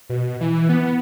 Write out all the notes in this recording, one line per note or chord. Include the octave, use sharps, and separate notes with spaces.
B2
E3
B3